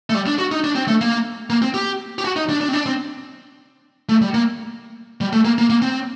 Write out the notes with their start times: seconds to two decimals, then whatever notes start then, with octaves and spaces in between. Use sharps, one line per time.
0.10 A3
0.15 G3
0.27 D4
0.39 F#4
0.52 D#4
0.64 D4
0.75 C4
0.88 A3
1.01 A#3
1.50 A#3
1.62 C4
1.74 G4
2.18 G4
2.25 F#4
2.36 D#4
2.49 D4
2.61 D4
2.68 C4
2.73 D4
2.86 C4
4.09 A3
4.21 G3
4.34 A#3
5.21 G3
5.33 A3
5.45 A#3
5.58 A#3
5.70 A#3
5.82 C4